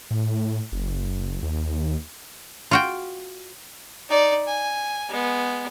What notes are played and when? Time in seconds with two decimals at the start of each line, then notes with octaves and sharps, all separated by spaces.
0.11 A2
0.72 F#1
1.43 D#2
2.71 F4 F#4 G5
4.09 D#4 D5
4.47 G#5
5.09 G#3 B3